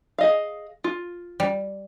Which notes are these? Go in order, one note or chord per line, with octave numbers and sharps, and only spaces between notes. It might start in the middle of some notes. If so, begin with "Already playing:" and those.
G#4 D#5 F5
F4
G3